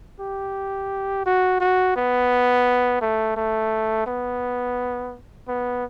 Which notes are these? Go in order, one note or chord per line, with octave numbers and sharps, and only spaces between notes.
G4
F#4
F#4
B3
A3
A3
B3
B3